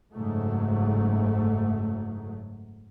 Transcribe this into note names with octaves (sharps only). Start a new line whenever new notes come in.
F#1 G#2 F#3 A3